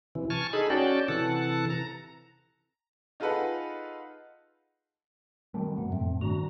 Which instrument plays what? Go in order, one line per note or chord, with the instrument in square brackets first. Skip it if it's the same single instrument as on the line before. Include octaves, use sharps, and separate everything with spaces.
[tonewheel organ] C3 E3
G#5 A5 C#6 F6
D#4 G#4 A4 B5
C#4 F#4 D5 G5 A5
C3 E3 A4 F#5 A5
A#5
[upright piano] D#4 F4 G#4 A4 B4 F#5
[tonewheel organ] D#3 C4 [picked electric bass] F#3 G3 A3
[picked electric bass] F#2 C3 F#3 [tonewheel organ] B3
[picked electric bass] F2 [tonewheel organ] A2 A3 C4
[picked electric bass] G2 D#3 D4 [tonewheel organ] F#4 A#5